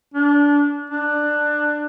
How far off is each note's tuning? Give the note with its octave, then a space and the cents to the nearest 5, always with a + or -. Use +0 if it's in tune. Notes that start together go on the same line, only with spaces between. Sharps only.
D4 -20
D4 +15